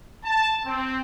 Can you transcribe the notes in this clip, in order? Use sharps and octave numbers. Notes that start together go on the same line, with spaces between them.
A5
C4